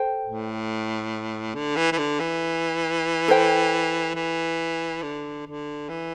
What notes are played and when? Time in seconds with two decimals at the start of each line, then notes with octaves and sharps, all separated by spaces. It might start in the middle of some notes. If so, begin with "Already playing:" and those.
Already playing: A4 C5 G5
0.24 A2
1.55 D3
1.76 E3
1.92 E3
1.98 D3
2.20 E3
3.28 A4 C5 G5
4.15 E3
5.02 D3
5.46 D3
5.89 E3